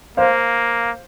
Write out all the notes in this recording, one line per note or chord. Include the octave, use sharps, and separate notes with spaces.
A#3 C5 F5